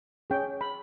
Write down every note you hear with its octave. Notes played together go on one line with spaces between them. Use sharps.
C#4 G#4 C#5 G5
B5